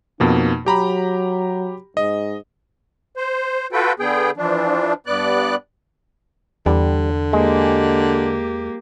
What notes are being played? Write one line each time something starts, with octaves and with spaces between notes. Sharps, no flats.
F2 B2 A#3 D#4
F#3 G4 A#5 B5
G#2 D#5
C5
F4 F#4 A4 B4 G5
D3 B3 G#4 G5
E3 F3 D4
G2 B3 D5 F#6
E2 D3 G3
G#3 A#3 G4